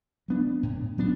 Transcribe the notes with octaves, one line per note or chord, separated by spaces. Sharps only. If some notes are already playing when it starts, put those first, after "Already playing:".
F#3 B3 D4
A2
F#3 B3 D4